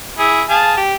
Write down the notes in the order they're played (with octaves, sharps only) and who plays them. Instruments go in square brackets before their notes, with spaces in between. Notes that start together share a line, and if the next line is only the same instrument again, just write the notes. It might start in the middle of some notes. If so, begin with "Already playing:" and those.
[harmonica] E4 G#4
G#4 F5 A5
G4